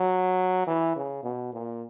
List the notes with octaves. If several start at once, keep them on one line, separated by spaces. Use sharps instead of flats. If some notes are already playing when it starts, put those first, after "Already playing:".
Already playing: F#3
E3
C#3
B2
A#2